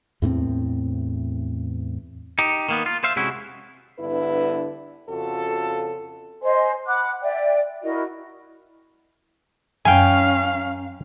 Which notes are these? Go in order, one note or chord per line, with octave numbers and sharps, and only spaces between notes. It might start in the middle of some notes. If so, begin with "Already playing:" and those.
E2 A2 B3 C4
D#4 G4
D#3 A#3 B3
F4
C5 E5 F5
C3 G#3 C#4 E4 F#4
G2 D3 B3 E4 B4
F2 C#3 F4 F#4 A4
C5 D#5 G#5 C6
F#5 B5 D6 F#6
D5 E5 G5
E4 F#4 A#4 D#5
F#2 C#4 F5 G5 G#5